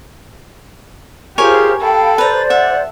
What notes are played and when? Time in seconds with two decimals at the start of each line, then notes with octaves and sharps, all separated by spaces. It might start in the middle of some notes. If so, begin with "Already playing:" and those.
1.38 F4 G4 G#4 A#4 C5 C#5 G#5
1.80 A4 F5 G5 B5
2.18 B4 C5 D5 A#5
2.50 E5 F#5